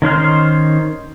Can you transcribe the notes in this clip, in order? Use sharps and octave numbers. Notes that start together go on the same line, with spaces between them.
D#3 C#4 C5 F6